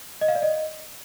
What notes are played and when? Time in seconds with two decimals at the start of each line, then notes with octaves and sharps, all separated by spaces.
0.21 D#5
0.28 F5
0.35 D5
0.42 D#5